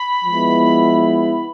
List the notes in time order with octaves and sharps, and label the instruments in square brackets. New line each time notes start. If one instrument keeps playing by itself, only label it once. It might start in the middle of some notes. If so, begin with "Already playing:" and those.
Already playing: [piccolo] B5
[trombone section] F3 G#3 B3 E4